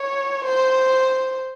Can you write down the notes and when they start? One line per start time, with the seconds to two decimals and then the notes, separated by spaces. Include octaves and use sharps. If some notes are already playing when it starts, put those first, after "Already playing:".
Already playing: C#5
0.45 C5